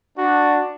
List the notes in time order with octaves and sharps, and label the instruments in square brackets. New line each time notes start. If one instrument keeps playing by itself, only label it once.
[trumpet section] D4 [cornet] F#4